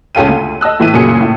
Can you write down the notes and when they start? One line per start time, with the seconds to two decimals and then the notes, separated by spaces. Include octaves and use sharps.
0.15 C#2 C#4 A4 F5 G5 D#7
0.28 D2
0.61 D#5 A5 E6 F#6
0.80 A2 E3 E5 B6 D#7
0.93 F#1 A#2 C#3 F#3 G#4 C#7
1.21 A2